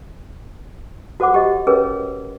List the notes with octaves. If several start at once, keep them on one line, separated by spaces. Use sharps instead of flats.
F#4 A4 C5 F#5 D6
G4 D#5
C#4 G#4 A#4 B4 C#5